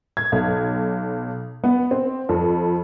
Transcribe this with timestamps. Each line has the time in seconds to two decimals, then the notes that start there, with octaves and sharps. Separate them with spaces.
0.17 G#6
0.32 B1
1.64 B3
1.91 C4
2.29 F2